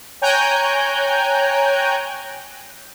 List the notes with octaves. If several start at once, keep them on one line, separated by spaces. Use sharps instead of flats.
C#5 G5 G#5 A#5 F#6 G6